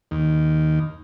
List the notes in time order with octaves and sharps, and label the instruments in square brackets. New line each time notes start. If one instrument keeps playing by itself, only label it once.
[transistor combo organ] D#2